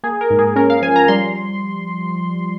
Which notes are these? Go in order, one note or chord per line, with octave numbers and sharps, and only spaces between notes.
A#3 G#4
A#4
G#2
G#4
C#4 A#4
F5
F3 G#5
A#5
G3 C6